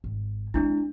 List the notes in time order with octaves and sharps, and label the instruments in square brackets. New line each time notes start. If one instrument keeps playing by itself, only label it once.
[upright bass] G#1
[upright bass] G#3 C4 [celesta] D4 E4